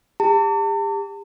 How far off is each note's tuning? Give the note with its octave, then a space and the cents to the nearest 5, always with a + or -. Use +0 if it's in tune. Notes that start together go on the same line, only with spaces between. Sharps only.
G4 +40 A5 +40